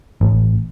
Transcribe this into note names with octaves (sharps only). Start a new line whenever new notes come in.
A1